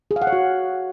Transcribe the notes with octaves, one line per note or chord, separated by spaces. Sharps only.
G#4
F5
F#5
C#5
F#4